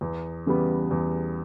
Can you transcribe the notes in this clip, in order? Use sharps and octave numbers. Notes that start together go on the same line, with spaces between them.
E2
C#3 E3 G3 B3
E2